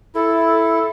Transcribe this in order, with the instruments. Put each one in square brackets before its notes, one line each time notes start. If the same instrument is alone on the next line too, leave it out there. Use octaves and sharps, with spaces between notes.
[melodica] E4 [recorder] A4